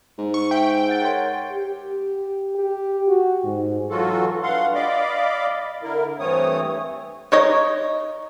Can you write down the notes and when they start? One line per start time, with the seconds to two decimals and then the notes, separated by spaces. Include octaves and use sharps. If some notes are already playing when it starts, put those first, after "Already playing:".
0.18 G#2
0.34 C#6
0.51 E5 G5
0.89 F#5 A6
1.02 A#4 C#5 C6
1.51 G4
2.55 G4
3.08 F#4
3.44 G#2
3.89 E3 F#3 F4 F#4 A4
4.43 G2 F5 F#5 C6
4.74 D5 D#5 F5 B5 D6
5.83 D3 E4 A#4
6.19 G2 E3 A3 C4 C#5 D#6
7.32 D#4 C#5 D#5